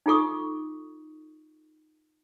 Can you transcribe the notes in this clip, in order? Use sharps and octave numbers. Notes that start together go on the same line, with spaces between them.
D#4 F4 A4 C#6 D#6